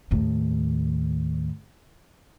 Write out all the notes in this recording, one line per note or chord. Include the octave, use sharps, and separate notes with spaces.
D#2 A2